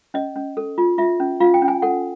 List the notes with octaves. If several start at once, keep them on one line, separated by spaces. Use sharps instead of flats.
C#4 D#5
C#4
A4
F4
F4 E5
C#4
F4 F5
G5
C#4
G#5
A4 F#5